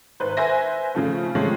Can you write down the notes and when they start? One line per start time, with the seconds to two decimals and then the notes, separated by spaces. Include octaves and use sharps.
0.20 G#1 B4 C5
0.37 B4 C5 E5 G#5 A#6
0.95 C#3 F3 A3
1.35 C3 F3 G#3 A3 C#4